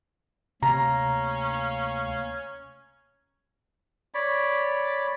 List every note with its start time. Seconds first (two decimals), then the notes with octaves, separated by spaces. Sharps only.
0.63 D2 C3 A#3 C#4 F5 A#5
4.14 C#5 D5 B5